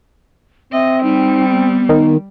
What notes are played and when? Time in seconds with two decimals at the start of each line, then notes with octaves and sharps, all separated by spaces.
0.73 C4 D#5 E5
1.03 G3 D#4
1.50 B3
1.89 D#3